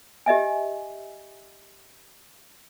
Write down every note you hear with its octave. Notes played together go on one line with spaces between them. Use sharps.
G4 D#5 E5 G#5